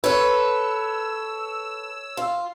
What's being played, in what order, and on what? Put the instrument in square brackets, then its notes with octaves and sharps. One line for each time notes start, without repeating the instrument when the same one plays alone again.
[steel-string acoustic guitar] A4 B4 [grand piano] C#5 [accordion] E6
[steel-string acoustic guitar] F4